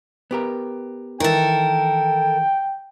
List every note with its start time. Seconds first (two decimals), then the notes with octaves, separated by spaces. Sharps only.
0.31 B3 G4 A#4
1.20 D#3 E3 A4 A#4 G5